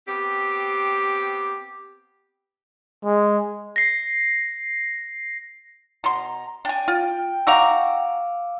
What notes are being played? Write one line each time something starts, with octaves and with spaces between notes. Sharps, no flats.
B3 C4 G4
G#3
A#6 C7
B2 A#5 C6
D4 G5 G#5
F4
D#4 F#4 F5 A#5 D6 E6